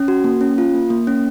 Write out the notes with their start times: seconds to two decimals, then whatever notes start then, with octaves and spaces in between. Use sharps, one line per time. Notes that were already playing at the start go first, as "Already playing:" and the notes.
Already playing: C#4
0.08 F#4
0.24 A#3
0.41 C#4
0.58 F4
0.74 A#3
0.90 A#3
1.07 C#4